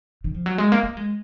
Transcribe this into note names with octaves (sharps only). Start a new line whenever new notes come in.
D#3
F3
F#3
G#3
A#3
A#3
G#3